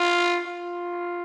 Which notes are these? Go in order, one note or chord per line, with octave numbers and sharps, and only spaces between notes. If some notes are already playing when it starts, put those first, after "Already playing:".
Already playing: F4
F4